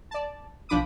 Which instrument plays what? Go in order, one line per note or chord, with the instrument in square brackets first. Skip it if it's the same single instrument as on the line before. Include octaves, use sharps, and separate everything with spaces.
[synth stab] D5 A5
B1 F3 D4 B5 D6 D#6